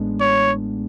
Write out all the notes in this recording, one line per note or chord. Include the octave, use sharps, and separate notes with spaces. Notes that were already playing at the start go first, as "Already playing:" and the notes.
Already playing: A1 A2 G#3 B3 D4
C#5